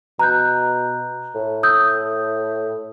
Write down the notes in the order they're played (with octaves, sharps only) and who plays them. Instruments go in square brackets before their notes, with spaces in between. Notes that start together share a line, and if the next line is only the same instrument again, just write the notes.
[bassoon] B2 [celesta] A#5 F#6 G6
[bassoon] A2
[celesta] D#6 E6 G6